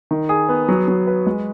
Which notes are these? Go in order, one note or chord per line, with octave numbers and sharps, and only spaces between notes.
D#3
G#4
B3
F#3
F#3
B4
G#3